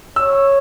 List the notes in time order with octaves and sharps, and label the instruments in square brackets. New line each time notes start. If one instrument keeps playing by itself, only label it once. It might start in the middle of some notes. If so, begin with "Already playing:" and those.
[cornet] C#5 [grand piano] E6